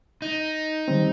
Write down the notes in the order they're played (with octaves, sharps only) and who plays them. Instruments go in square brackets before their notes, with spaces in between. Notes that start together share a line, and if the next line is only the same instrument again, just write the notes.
[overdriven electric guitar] D#4
[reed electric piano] D#3 G3 C4